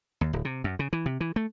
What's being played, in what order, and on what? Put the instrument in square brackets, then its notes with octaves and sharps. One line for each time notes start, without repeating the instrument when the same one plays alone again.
[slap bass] D#2
D1
C3
F#2
C#3
E3
C3
E3
A3